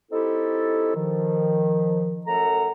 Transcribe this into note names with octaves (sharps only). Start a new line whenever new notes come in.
C4 D#4 E4 G4 A4
D#3 F3
F#2 A3 A4 F#5 A#5